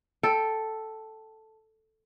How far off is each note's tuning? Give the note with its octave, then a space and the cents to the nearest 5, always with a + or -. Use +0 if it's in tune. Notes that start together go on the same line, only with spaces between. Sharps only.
A4 +0 G5 +0